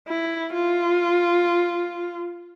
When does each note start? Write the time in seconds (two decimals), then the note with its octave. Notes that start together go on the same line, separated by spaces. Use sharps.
0.08 E4
0.53 F4